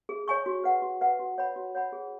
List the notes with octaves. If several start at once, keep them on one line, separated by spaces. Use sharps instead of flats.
G#4
C#5 G#5 C#6
F#4
B4 F#5
F#4
B4 F#5
F#4
C#5 F#5 B5
F#4
C#5 F#5 B5
G#4